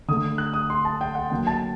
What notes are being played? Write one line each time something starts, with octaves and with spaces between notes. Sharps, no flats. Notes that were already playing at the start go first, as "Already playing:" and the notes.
D3 A3 D#6
F#6
D#6
C6
A5
G5
F#5
D3 F#3 A#3 G5
A5